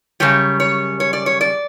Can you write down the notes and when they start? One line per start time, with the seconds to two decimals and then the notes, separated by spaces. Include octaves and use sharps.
0.20 F#2 C#3 G3 C#5
0.60 C#5
1.00 C#5
1.13 D5
1.26 C#5
1.41 D5